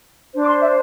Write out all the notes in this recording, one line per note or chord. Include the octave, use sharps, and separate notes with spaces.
D4 C5
D6
C6
E5